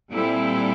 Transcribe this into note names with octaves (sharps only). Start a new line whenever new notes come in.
A#2 G3 C4 E4 A4